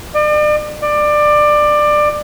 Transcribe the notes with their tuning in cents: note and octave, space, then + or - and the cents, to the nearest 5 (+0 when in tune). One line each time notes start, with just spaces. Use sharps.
D5 +40
D5 +20